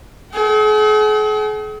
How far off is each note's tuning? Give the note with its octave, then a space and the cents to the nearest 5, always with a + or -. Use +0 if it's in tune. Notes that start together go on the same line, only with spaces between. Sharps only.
G#4 +45 G5 -45